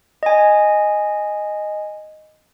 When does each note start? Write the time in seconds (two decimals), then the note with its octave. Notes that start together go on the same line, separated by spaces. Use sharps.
0.23 D#5 G#5